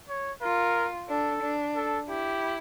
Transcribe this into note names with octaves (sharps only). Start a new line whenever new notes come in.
C#5
F4 A#4
D4 A4
D4
A4
E4 G4